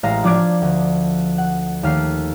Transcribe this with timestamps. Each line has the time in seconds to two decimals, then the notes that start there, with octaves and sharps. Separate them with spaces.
0.03 A1 G#3 F5 A#5 C7
0.24 F3 D4 D6 F6 G#6 D7
0.62 D2
1.38 F#5
1.83 D#2 A3 F6 C7